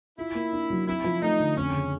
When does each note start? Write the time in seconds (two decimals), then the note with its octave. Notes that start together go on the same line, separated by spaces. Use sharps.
0.18 E4 F4
0.35 A#3
0.53 D4
0.70 F#3
0.87 C4 E4
1.04 F3
1.22 A3 D#4
1.40 D3
1.56 F2 C#4
1.74 C#3